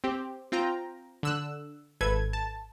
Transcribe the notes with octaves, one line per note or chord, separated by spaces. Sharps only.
C4 G4
C4 F4 G5 A#5
D3 E6 F#6
G#1 A4 B4 G#6
A5